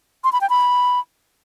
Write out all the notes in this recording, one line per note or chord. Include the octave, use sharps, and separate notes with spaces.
C6
B5
G5
B5